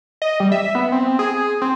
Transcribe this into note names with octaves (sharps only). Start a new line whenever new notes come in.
D#5
G3
E5
B3
C4
G#4
C4